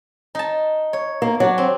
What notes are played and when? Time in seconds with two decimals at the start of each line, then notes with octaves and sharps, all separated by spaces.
0.35 D#4 A5
0.93 C#5
1.22 A#3
1.40 F#3 D4
1.58 C4